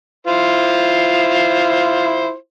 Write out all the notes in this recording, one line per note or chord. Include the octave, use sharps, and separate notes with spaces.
E4 F4 C5